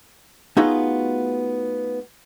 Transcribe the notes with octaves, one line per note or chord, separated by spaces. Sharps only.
A3 B3 D#4 F4 F#4 G#4